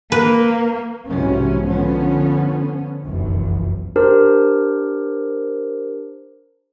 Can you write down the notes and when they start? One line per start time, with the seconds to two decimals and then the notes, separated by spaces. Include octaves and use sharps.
0.12 A#3 B4
1.08 B1 G#2 C3 E3 F#3 C#4
1.63 D3 F3 B3 C#4
3.04 F1 B1 F#2 E3
3.96 D4 G4 A#4 C5